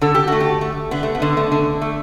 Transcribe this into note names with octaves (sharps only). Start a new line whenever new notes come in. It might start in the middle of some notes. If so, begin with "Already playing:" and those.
D3 A4
G4
A3 F#4
G4
A3
D3 B3
A3
B3
D3
A3
D3
A3